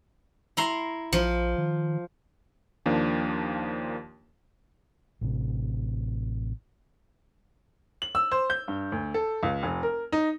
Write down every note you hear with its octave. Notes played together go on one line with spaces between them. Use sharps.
E4 A#5 C6
A#1 F3
D#3
D#2 F3 A#3 D4
A1 C3
F#7
E6
C5
G6
G2
D2
A4
C#2
F1
A#4
D#4